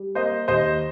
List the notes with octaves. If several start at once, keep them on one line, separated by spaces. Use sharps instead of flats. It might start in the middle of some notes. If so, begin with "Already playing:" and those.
Already playing: G3
A#3 C5 D#5
D#2 C5 D#5